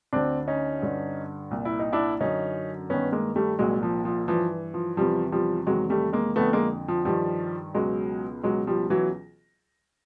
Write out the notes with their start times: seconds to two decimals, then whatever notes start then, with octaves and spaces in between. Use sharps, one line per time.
0.13 D2 D3 C4 D4
0.48 C#4 D#4
0.82 G2 D3
1.51 C2 A#2
1.65 E4
1.79 D#4
1.93 D4 E4
2.20 F#2 D3 C#4 D#4
2.90 G2 D#3 B3 C#4
3.12 G#3 A#3
3.36 G3 A3
3.59 C2 A#2 F#3 G#3
3.83 F3
4.05 F3
4.28 G2 E3 F3
4.74 F3
4.97 E2 C3 E3 F3 G3
5.32 F3 G3
5.67 E2 C3 D#3 F#3 G#3
5.90 G3 A3
6.13 G#3 A#3
6.36 F2 D3 A3 B3
6.53 G#3 A#3
6.88 F3
7.05 G2 D#3 F3 G3
7.75 C#2 B2 F#3 G#3
8.44 C#2 B2 F#3 G#3
8.67 F3 G3
8.90 E3 F#3